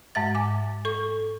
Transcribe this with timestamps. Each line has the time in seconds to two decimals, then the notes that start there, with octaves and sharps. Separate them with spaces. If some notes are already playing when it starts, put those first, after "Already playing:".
0.15 G#2 G#3 E5 A6
0.35 G#5 D6
0.85 A4 C#6